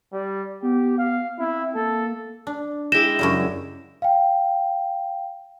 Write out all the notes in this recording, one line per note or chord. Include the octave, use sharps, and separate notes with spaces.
G3
B3 G4
F5
C4 E4
A#3 A4
D4
G#3 E4 G#4 G5 A#6 E7
F#2 C#3 G3
F5 G5